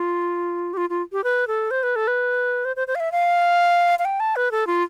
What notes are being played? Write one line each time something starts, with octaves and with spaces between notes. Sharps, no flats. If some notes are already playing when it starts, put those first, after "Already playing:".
Already playing: F4
G4
F4
F4
G4
B4
A4
C5
B4
A4
B4
C5
C5
C5
F5
E5
F5
F5
G5
A5
B4
A4
F4